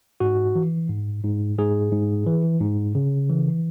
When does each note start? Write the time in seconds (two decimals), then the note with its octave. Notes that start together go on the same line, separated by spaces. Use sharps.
0.20 G#2 F#4
0.55 E3
0.89 G#2
1.23 G#2
1.58 G#2 G#4
1.92 G#2
2.27 E3
2.61 G#2
2.95 C#3
3.29 E3